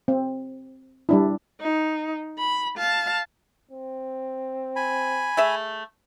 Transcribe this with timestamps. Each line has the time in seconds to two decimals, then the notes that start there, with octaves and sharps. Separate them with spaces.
0.08 C4
1.09 G3 D4 E4
1.60 D#4
2.38 B5
2.78 F5 A5
3.71 C4
4.76 G#5 B5
5.37 A3 G#4 E5